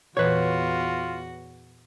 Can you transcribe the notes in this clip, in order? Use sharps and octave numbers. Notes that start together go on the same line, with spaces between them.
E2 A#2 E3 F4 F#4 B4 C#5